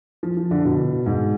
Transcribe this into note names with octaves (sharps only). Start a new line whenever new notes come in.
F3
F3
D3
B2
G#2